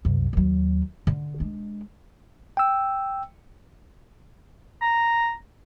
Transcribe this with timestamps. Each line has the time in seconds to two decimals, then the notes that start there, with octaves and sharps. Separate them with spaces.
0.05 C2 F#2
0.33 D#2 F#3
1.07 D3
1.40 G#3 D4
2.57 G5 E6
4.82 A#5